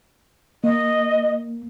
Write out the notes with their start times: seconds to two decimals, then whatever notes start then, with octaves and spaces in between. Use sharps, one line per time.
0.64 A#3 D#5